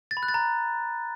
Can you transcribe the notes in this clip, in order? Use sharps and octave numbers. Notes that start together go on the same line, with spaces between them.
A6
B5
F#6
A6
A#5